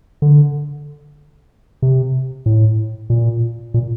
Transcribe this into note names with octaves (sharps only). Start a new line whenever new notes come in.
D3
C3
A2
A#2
A#2